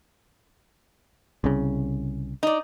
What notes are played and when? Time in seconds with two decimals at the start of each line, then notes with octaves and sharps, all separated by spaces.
1.44 C2 C#3
2.43 D#4 D5